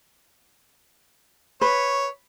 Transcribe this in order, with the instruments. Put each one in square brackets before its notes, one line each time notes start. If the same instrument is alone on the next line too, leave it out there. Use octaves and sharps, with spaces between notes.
[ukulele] B4 [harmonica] C#5